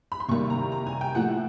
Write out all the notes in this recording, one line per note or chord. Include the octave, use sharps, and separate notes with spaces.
B5
C6
C3 D#3 G3 A#3 C#6
A#5
A#5
G#5
G5
A2 F3 A3 F#5